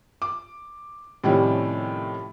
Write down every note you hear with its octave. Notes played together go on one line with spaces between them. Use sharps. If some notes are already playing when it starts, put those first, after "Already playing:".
D6
A2 C3 D#3 F3 G3 C#4